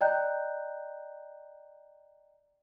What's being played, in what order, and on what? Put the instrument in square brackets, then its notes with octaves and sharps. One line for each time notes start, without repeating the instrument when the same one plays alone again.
[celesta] D5 D#5 G5 A#5 F#6 G6